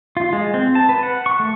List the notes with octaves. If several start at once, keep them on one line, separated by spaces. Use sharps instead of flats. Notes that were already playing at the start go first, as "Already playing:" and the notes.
F4
G#3
C4
A5
B4
F#5
C#6
A3